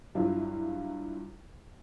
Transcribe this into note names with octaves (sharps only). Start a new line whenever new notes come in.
G2 F#3 E4 F4